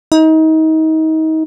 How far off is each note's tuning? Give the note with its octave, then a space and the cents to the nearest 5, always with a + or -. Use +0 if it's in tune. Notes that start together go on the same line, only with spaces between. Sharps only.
D#4 +30